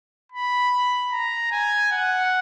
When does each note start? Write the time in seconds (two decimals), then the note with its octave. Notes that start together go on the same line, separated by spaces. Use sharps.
0.32 B5
1.12 A#5
1.51 G#5
1.92 F#5